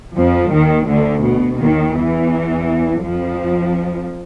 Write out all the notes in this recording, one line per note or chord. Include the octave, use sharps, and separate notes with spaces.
F2 F3
D#2 D#3
D2 D3
B2
D#2 D#3
E2 E3
F2 F3